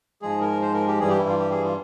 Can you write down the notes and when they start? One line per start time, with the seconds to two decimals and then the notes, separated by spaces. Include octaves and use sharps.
0.22 G#2 F3 G#3 G#4
0.41 A#4
0.62 C5
0.74 A#4
0.87 G4
0.99 G2 E3 G3 G#4
1.09 G4
1.19 E4
1.28 F4
1.38 G4
1.51 G#4
1.64 F4